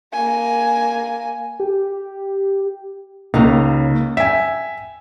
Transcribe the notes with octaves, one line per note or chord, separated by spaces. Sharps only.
A#3 G#5
G4
C#2 C#3 A#3 D#4
E5 G5 G#5